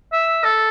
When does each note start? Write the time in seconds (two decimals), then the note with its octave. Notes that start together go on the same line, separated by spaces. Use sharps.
0.13 E5
0.44 A4